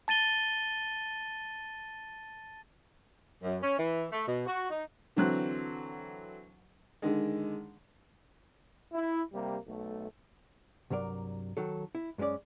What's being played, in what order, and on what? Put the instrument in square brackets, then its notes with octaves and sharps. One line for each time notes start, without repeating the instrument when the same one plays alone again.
[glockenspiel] A5 A6 D#7 G7
[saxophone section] F#2
C#4
E3
A3
B2
F#4
D#4
[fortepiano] D3 E3 F#3 C4 F#6
D3 D#3 G#3
[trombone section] E4
C3 G3 A#3
B1 A3
[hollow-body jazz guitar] C2 G2 F#3 A#4 D5
D#3 F#3 A4
E4
F#2 G#3 A3 C#4 D5